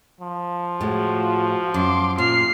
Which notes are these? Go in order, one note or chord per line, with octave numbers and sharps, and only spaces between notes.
F3
A2 G#3 F4 F#4
F#2 C6 D6
A#2 F6 C7